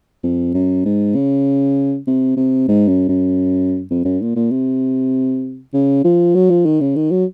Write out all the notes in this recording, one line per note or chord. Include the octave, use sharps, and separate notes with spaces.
F2
F#2
G#2
C#3
C3
C3
G#2
F#2
F#2
F2
F#2
A#2
A#2
C3
C#3
F3
F#3
F3
D#3
C#3
D#3
F#3